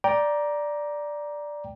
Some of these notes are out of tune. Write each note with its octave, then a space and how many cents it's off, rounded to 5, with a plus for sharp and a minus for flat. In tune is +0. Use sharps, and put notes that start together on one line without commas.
D5 +0 G5 +0 A#5 +15